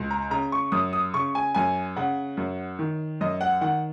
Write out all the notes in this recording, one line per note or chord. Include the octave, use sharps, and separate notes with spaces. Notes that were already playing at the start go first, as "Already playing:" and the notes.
Already playing: C#2
A#5
C#3 A#5
C#6
F#2 D#6
D#6
C#3 C#6
G#5
F#2 G#5
C#3 F#5
F#2
D#3
F#2 D#5
F#5
D#3 F#5